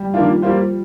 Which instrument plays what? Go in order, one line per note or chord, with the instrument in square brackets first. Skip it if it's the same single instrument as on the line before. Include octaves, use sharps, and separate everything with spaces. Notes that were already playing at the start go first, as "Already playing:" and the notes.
Already playing: [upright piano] G3
[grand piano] D#3 A#3 D4 F4 [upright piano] F3
[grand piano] G3 A#3 F4 C5